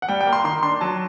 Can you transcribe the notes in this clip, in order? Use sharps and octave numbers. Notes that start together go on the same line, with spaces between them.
F#5
G3 G5
G5
A#3
C6
D#3 C6
D4 C6
F#3 A5